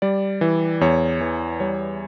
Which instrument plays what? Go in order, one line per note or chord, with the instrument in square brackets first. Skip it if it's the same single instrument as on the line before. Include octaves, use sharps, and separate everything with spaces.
[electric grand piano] G3 D5
E3
E2 C#5
E3
G3 C#5